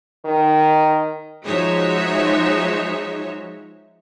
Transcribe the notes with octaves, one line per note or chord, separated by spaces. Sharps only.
D#3
F3 G#3 D#4 F#4 C#5 E5